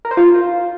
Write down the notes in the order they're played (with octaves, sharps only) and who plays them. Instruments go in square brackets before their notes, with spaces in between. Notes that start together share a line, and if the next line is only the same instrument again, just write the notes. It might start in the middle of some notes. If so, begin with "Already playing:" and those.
[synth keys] A#4
C5
F4